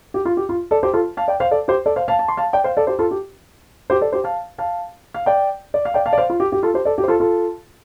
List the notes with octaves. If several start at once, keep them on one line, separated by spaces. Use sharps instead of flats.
G4
F4
G4
F4
A4 D5
G4 C5
F4 A4
F5 A5
D5 G5
C5 F5
A4 D5
G4 C5
A4 D5
C5 F5
F5 A5
A5
C6
F5 A5
D5 G5
C5 F5
A4 D5
G4 C5
F4 A4
G4
G4 C5
A4 D5
G4 C5
F5 A5
F5 A5
F5
D5 G5
D5
F5
D5 G5
F5 A5
D5
C5 F5
F4
G4
G4
F4 A4
G4 C5
A4 D5
G4
C5
F4 A4
F4 A4